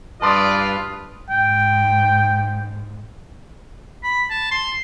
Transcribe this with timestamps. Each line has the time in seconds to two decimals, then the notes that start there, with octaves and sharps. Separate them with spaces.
0.22 G2 F4 B4 D5 A5 C6 D#6
1.30 G#2 G5
4.03 B5
4.30 A5
4.51 C6